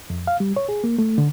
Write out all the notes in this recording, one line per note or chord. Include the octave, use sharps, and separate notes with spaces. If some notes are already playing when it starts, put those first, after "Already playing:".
F2
F5
G3
C#5
G#4
A#3
A3
D3